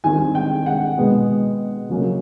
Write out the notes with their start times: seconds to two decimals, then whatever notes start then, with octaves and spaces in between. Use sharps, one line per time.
0.04 D#3 G3 C4 G#5
0.35 G5
0.66 F#5
0.97 B2 G#3 B3
1.89 C#3 F#3 A#3 C#4